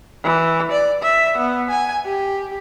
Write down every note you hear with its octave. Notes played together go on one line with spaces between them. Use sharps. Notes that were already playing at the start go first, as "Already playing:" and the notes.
E3
D5
E5
B3
G#5
G4